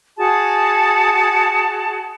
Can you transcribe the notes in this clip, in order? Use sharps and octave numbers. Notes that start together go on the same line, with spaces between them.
F#4 G#4 A5